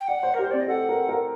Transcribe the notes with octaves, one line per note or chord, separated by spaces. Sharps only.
G5
D5 F#5
C5
A#4
G4
C5
C4 D5
D#5
A4 F#5
A#4
A#4